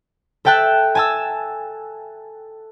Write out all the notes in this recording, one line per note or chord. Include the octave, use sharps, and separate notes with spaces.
A4 E5 G5 A5 F#6
G#5 A5 E6